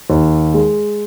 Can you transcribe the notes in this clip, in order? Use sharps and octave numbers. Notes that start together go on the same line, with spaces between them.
D#2
G#3